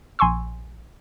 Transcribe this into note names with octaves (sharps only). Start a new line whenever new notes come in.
A#1 G#5 C6 C#6 E6